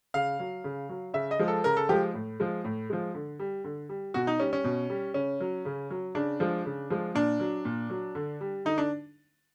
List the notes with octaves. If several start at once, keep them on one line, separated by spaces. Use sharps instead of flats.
C#3 F5
F#3
C#3
F#3
C#3 E5
D#5
F3 G#3
A4
C#3 A#4
A4
F3 G#3 G4
A2
F3 G#3
A2
F3 G#3
D3
G3
D3
G3
B2 F#4
D#4
G3 C#4
C#4
B2
G3
C#3 C#4
F#3
C#3
F#3
C#3 D4
F3 G#3
C#3
F3 G#3
A#2 D4
F#3
A#2
F#3
D3
G3
D3 D#4
D4